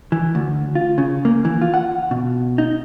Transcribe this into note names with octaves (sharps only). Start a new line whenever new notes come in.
E3
D2
F4
C#3
A#3
E3
F4
F#5
B2
D#4